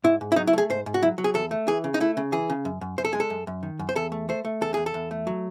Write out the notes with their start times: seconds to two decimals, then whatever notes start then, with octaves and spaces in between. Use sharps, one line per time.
0.04 G#2 E4
0.21 G#2
0.32 E4
0.36 F#3 D#4
0.47 E4
0.53 A3 G#4
0.70 G#2 C5
0.86 G#2
0.94 F#4
1.02 F#3 E4
1.18 F#3
1.24 G#4
1.34 E2 A4
1.51 A3
1.68 E3 G#4
1.84 C#3
1.94 D#4
2.00 A3 E4
2.17 C#3
2.32 E3 G#4
2.50 C#3
2.65 F#2
2.81 F#2
2.98 F#2 C5
3.05 A4
3.13 G#3 G#4
3.20 A4
3.30 F#2
3.47 F#2
3.63 D#3
3.79 F#2
3.89 C5
3.96 E2 A4
4.12 A3
4.29 A3 C5
4.45 A3
4.61 E2 A4
4.74 E2 G#4
4.86 A4
4.94 E2
5.11 A3
5.27 F#3